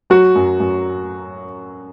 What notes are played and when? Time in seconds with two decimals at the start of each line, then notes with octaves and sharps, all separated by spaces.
0.10 F#3 F#4
0.35 F#2
0.60 F#2